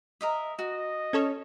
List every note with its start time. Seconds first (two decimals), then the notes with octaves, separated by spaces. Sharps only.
0.21 A#4 D#5 E5
0.59 F#4 D#5
1.13 C#4 A4 C#5